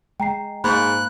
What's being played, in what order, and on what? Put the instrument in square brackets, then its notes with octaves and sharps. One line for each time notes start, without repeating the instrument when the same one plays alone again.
[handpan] G#3 [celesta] G5 A#5 C7
[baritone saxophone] G#2 [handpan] A#3 [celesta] B5 [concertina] F#6